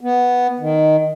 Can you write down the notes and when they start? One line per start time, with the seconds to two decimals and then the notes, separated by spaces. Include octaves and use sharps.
0.01 B3
0.59 D#3